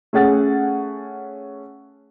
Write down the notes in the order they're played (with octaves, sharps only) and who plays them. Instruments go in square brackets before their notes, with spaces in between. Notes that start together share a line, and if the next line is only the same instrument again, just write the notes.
[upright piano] A3 C#4 G#4 F#5 A6